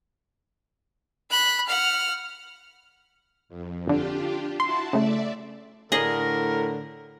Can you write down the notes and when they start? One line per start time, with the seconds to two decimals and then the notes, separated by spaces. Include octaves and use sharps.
1.30 B5 F#6
1.68 F#5 F6
3.49 F2
3.87 G1 D3 D4 F4 G4
4.60 E4 F#4 A5 C6
4.93 C#3 A3 D5 E5
5.92 A2 D3 G#4 A#4 D#5